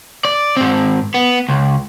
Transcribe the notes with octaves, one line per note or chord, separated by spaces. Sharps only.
D5
G#2 C4
B3
C#2